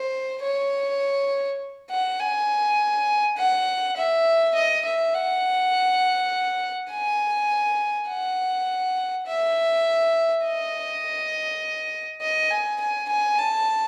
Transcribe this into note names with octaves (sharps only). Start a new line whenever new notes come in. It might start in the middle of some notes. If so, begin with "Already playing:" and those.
Already playing: C5
C#5
F#5
G#5
F#5
E5
D#5
E5
F#5
G#5
F#5
E5
D#5
D#5
G#5
G#5
G#5
A5